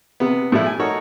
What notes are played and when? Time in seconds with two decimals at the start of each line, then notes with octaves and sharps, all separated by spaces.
0.20 C3 B3
0.52 A2 F3 G3 E4
0.66 G#5
0.79 D#4 F#4 A4 A#4 C#5